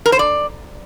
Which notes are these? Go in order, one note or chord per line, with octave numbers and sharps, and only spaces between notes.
A#4
C5
D5